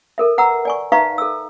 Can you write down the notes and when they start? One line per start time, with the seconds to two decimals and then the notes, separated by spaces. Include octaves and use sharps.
0.18 A4 A#4 E5
0.38 B4 F#5 A#5 E6
0.65 D5 G#5 C#6
0.92 D#4 B4 E5 F5 A#5 C#6
1.18 A4 E6